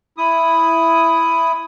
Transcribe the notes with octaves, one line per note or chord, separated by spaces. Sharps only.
E4 D#6